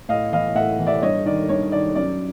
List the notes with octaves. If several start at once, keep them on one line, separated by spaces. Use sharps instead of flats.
A2 D#5 F5
E3 D#5 F5
A2 E5 F#5
E3
D5 E5
G2 C#5 D#5
D#3 D5
G2 C#5
D#3 D5
F#2 D5